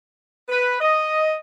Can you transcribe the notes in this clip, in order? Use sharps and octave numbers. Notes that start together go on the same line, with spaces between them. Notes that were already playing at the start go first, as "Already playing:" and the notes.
B4
D#5